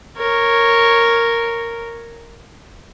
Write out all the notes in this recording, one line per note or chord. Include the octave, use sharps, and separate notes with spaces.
A#4 C#5